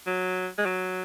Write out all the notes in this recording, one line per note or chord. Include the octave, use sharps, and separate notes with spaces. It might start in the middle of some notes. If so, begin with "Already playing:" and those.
F#3
G#3
F#3